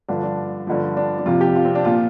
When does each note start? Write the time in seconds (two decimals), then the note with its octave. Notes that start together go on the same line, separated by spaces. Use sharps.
0.08 G2 D3 F3 D4
0.23 D4
0.67 G2 D3 F3
0.97 D4
1.19 D4
1.26 F2 C3 F3 F4
1.41 G4
1.56 F4
1.65 C4
1.75 D4
1.85 A#2 F3 F4